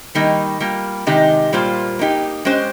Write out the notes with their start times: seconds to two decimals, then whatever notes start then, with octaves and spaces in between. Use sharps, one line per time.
0.15 D#3 G3 A#3 D#4
0.60 G3 A#3 F4
1.07 C3 D#3 G#3 D#4 G4
1.53 A#2 G3 A#3 F4 C5
1.99 A#3 D#4 G4
2.45 G#3 C#4 G4 C5